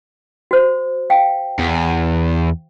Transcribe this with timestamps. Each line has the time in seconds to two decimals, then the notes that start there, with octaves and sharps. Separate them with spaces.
0.51 F#4 C5
1.10 F5 G5
1.59 E2